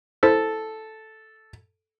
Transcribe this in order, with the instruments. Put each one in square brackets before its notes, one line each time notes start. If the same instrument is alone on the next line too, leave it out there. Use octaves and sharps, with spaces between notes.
[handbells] E4 C5 B6 [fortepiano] A4